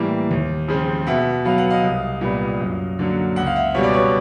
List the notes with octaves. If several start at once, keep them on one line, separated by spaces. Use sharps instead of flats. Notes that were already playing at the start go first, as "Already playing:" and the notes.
Already playing: A2 E3 G3 A#3
D#2
C#3 F3 G#3 C4
B2 E5 F#5
F#3 B3 F5
F#5
D#5 F5
C2
A#2 G3 B3
F#2
D3 F#3 A#3
C#2 F#5
F5
E5 F#5
B2 G3 C#5
D5
B4 C#5